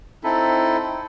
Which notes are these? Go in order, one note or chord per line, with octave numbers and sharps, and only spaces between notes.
C4 D#4 E4 A4